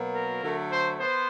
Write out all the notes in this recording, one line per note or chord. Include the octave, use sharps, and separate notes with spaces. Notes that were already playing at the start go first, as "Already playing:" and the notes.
Already playing: B2 F#3 A#3
A#4
D3 F#3 A3
C5
B3 C5